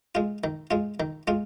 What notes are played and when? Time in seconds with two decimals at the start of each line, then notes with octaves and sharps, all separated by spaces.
0.15 G#3 F4
0.44 D#3
0.71 G#3 F4
1.00 D#3
1.28 G#3 F4